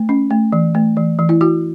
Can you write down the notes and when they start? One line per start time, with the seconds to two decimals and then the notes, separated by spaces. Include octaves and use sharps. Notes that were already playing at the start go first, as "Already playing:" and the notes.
Already playing: A3
0.09 C#4
0.30 A3
0.52 E3
0.75 A3
0.97 E3
1.19 E3
1.29 E4
1.41 E4 F#4